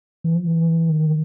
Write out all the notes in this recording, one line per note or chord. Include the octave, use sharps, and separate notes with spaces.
E3
F3
E3
D#3